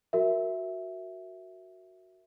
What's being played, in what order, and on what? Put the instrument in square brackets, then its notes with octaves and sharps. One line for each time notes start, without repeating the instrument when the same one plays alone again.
[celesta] F#4 A#4 E5